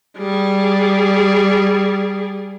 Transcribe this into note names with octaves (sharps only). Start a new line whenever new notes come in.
G3 G#4